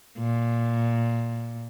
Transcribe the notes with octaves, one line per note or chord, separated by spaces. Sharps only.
A#2